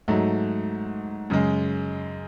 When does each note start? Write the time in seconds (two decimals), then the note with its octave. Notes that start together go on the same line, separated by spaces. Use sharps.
0.08 G#2 F#3 A3
1.30 F#2 C#3 G#3